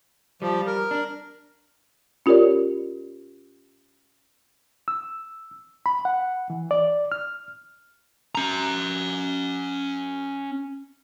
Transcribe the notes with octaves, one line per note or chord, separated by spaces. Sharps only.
F3 G3
A#4
D4
C#4 F4 G4 A#4 C#5 D5
E6
B5
F#5
E3
D5
F6
C#4 A#5